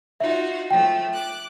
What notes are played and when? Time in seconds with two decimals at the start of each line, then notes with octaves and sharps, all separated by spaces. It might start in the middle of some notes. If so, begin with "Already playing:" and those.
0.20 D#4 F4 F#4 E5
0.71 F3 A3 G5
1.14 D6 F#6